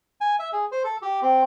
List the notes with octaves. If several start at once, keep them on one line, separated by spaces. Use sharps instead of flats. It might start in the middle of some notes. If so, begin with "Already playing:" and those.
G#5
E5
G#4
C5
A4
G4
C4